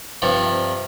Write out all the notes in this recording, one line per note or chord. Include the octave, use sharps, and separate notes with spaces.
G2 C3 F3 D4